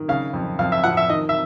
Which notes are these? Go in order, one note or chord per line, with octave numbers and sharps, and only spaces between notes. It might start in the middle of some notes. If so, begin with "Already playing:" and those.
Already playing: D#3
C#3 F5
F2
F2 F5
E5
F3 F#5
E5
D#3 D#5
E5